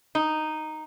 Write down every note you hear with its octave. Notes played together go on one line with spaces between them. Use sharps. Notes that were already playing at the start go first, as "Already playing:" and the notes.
D#4